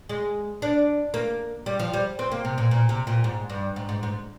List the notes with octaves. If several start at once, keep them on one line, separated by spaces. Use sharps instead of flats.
G#3
D4
A#3
G3
F3
G3
C4
A#3
C3
A#2
A#2
C3
A#2
G#2
G2
G#2
G#2
G#2